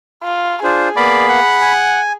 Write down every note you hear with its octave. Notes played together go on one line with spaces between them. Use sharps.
F4
D4 F4 G#4 C5
A#3 B3 D5 F5 B5
F#5
G#5